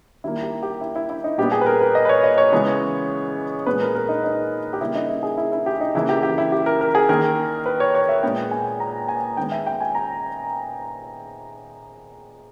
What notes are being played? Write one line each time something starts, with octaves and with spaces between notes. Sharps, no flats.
D#3 G3 A#3 E4
G4
G4
E4
E4
E4
D#4
A#2 G3 B3 G4
G#4
B4
A#4
B4
D#5
B4
C#5
D#5
C#5
C#3 E3 G#3 B3
A#2 G#3 B3 B4
A#4
A#4
D#4
D#4
G4
C#3 G3 A#3 E4
D#4
E4
G#4
E4
E4
G4
D#4
C#3 E3 A#3 E4
G4
G4
E4
G4
A#4
A#4
G#4
D#3 A#3 A#4
B4
C#5
C#5
E5
A#2 G#3 B3 G5
G#5
A#5
G#5
D#3 G#3 B3 G5
E5
G5
G#5
A#5